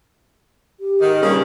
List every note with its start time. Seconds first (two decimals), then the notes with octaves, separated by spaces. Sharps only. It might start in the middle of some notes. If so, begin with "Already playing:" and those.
0.80 G4
1.01 G#2 D#3
1.22 G2 A#2 C#3 G3